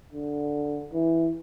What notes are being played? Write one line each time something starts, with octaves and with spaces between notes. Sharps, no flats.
D3
E3